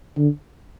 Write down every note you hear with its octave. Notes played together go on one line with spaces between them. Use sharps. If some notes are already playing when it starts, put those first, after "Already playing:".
D3